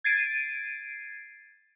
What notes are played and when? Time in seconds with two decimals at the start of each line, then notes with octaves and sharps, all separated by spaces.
0.04 G#6 A6 C7 D7 D#7